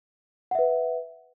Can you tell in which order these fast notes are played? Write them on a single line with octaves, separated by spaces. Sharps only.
F#5 E5 B4